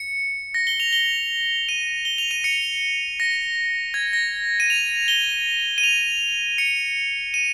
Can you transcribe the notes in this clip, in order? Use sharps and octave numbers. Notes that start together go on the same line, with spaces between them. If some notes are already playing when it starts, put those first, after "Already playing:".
Already playing: C#7
A#6
G7
F7
G7
D#7
G7
F7
D#7
C#7
A#6
G#6
A#6
D#7
F7
G7
D#7
F7
C#7
D#7